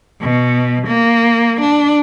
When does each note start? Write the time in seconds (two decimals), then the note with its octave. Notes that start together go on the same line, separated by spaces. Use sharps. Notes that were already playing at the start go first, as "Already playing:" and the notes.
0.21 B2
0.87 A#3
1.60 D4